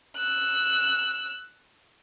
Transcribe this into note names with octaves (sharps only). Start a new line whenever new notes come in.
E6 F#6